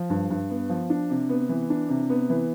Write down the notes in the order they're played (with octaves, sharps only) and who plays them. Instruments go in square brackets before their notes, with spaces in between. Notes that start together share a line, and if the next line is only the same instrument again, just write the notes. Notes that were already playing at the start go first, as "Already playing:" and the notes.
Already playing: [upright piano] F3
G2
G2
B3
F3
D4
C3
B3
E3
D4
C3
B3
E3